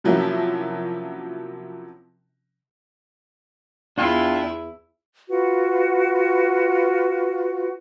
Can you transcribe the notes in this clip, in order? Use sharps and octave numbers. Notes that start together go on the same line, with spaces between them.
C3 F3 F#3 A#3 C#4 E4
E2 D4 E4 F4 G5 G#5
F4 F#4 B4